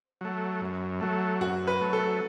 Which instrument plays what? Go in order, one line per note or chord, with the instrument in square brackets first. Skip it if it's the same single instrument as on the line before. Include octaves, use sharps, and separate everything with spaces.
[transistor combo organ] F#3 A3
F#2
F#3 A3
[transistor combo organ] F#2 [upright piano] F#4
[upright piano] B4
[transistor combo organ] F#3 A3
[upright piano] A4